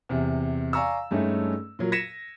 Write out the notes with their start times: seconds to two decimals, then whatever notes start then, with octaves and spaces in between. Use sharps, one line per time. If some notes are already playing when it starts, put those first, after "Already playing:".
0.09 E2 C3
0.73 D5 F5 G#5 A#5 C#6 E6
1.11 G2 G#3 A3 C#4 D#4
1.79 A#2 F#3 A#4
1.92 G#6 A#6 B6 C#7 D#7 E7